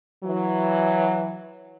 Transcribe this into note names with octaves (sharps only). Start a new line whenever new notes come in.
E3 F#3